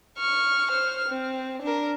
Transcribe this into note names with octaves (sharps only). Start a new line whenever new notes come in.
C#6 F6
C5 F6
C4
D4 A#4